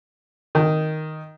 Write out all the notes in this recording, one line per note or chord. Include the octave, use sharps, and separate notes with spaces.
D#3